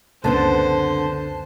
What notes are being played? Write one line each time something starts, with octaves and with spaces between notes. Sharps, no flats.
C#2 F#2 D3 B3 C4 C5 A5